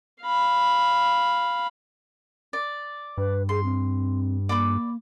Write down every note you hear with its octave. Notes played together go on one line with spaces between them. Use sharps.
F5 B5
D5
G2 B4
G#4 C6
C4
A#3 D5 B5 D6